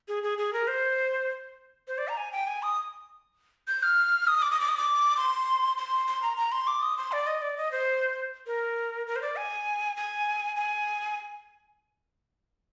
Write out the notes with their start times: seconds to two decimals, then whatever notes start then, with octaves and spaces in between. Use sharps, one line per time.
0.08 G#4
0.23 G#4
0.38 G#4
0.53 A#4
0.68 C5
1.88 C5
1.98 D5
2.08 A#5
2.17 G#5
2.32 G5
2.47 G#5
2.63 D#6
3.68 G6
3.83 F6
4.27 D#6
4.42 D6
4.51 D#6
4.60 D6
4.69 D#6
4.77 D6
5.17 C6
5.77 C6
6.07 C6
6.22 A#5
6.37 A#5
6.52 C6
6.67 D6
6.82 D#6
6.97 C6
7.12 D5
7.27 D#5
7.42 D5
7.57 D#5
7.72 C5
8.47 A#4
9.07 A#4
9.16 C5
9.22 D5
9.36 G#5
9.97 G#5
10.56 G#5